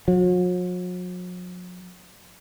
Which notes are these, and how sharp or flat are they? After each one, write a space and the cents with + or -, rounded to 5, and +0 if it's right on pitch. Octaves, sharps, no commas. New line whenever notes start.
F#3 -45